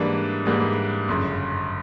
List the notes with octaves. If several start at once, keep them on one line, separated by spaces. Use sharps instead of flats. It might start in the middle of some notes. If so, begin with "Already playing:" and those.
Already playing: G#2 E3 G3 A#3 D4
G#2 E3 G3 A#3 D4
G1 F#2 C#3